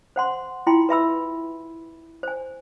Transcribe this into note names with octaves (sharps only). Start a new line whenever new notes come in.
C5 F#5 C6
E4 F4 G5 B5 C6
B4 E5 B5 E6
C5 G#5